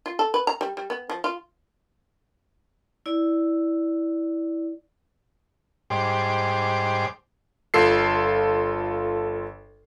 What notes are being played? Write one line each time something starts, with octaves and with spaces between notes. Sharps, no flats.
F4
A4
B4
A#5
G3
G3
B3
F3
F4
E4 D5
G#2 G3 C5 D6
G1 F4 A4 C7